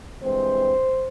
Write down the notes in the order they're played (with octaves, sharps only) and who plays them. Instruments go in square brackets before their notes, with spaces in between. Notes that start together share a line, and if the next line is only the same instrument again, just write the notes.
[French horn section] G2 E3 G#3 C4 C5